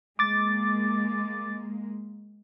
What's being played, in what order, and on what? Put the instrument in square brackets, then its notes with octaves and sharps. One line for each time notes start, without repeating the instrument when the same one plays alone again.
[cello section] G#3 A#3 [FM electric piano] D6 A6